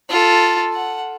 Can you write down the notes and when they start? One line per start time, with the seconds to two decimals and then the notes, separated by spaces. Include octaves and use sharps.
0.10 F4 A4
0.74 F#5